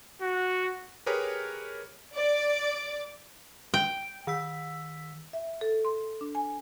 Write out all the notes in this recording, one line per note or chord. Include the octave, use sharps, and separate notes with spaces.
F#4
G4 G#4 A#4 B4 C#5
D5
G5
D#3 E6 B6
E5
A4
C6
D4
G#5